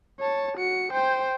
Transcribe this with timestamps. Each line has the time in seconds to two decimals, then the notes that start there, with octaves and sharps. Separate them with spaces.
0.20 C#5 A5
0.57 F#4 C#7
0.92 C5 G5